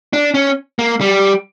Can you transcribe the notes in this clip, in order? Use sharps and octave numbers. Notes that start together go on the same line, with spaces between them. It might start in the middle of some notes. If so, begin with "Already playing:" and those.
D4
C#4
A#3
G3